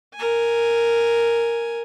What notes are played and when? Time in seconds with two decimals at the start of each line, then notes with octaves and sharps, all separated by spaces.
0.15 A#4 G#5